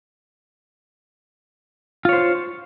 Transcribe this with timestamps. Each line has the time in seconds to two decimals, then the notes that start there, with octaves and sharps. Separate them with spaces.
2.05 F4
2.09 C#5
2.13 C5